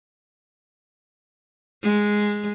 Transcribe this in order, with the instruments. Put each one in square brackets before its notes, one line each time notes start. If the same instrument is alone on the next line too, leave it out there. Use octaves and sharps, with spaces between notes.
[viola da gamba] G#3